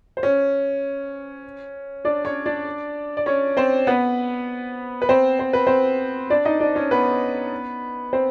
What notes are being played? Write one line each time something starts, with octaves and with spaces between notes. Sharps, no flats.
C5
C#4 C#5
D4 D5
C#4 C#5
D4 D5
D5
C#4 C#5
C4 C5
B3 B4
B4
C4 C5
C5
B4
C4 C5
D4 D5
D#4 D#5
D4 D5
C#4 C#5
B3 B4
C4 C5